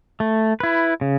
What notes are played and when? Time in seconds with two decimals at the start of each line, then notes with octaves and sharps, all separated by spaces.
0.20 A3
0.60 E4 B4
1.01 C#3